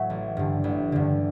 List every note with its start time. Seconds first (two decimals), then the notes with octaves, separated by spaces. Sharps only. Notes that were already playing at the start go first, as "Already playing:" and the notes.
Already playing: A2 F#3 A3
0.10 A1
0.37 G2 D3
0.64 A1
0.92 G2 D3